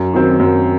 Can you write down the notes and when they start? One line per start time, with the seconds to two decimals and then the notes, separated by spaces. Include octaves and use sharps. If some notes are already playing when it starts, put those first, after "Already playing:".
Already playing: F#2
0.13 D#3 F#3 C4
0.40 F#2